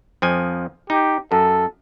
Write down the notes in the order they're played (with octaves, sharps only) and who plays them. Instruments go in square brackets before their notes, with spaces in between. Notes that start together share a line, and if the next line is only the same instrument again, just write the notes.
[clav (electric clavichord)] F2 F3 G#5
[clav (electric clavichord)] D#4 [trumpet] G4
[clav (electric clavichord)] F#2 [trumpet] A4